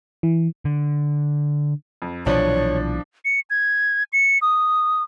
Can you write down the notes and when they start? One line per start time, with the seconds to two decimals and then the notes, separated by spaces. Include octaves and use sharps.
0.23 E3
0.65 D3
2.02 F2
2.26 B1 A#2 E3 F3 D4 C#5
3.25 C#7
3.50 G#6
4.13 C#7
4.42 D#6